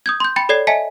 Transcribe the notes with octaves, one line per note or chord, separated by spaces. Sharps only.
D#6 G6 G#6
C6 G6
G5 B5 A6 C#7
A4 C#5 D5 G#6 C7
D#5 E5 G#5 A5 B6 C#7